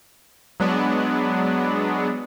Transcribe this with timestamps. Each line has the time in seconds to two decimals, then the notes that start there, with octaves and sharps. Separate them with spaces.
0.60 F#3 G#3 B3 D4